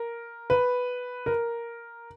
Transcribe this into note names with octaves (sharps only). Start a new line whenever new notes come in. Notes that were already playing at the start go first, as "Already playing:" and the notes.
Already playing: A#4
B4
A#4